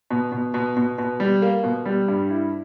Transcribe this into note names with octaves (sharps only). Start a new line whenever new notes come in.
B2
B2
B2
B2
B2
G3
A#3
B2
G3
G2
E4